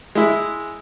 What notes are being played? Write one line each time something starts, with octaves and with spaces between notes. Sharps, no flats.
G#3 E4